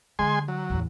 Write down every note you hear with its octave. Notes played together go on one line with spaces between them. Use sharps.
D3 G#3 G#5 C6
F#3
A1 E2